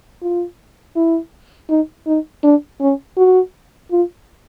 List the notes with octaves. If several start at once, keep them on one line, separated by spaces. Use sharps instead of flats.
F4
E4
D#4
D#4
D4
C#4
F#4
F4